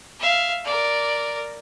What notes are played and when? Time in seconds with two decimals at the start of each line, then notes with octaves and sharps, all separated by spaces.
0.20 E5 F5
0.65 A#4 D5